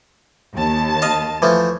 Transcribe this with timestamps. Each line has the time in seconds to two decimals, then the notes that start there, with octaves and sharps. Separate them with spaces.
0.54 D#2 A5
1.02 D#5 F5
1.42 E3 F3 A3